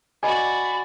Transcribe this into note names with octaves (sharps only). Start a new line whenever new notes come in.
F#4 G#4 D5 D#5 G#5 B5